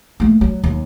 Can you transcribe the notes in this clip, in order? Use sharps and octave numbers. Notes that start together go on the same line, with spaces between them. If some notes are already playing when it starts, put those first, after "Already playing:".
A3 A#3
F#3
D#2